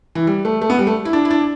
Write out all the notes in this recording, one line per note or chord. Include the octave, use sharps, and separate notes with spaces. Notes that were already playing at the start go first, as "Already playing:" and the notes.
E3
G3
A3
A3
B3
G3
A3
E4
D4
E4
D4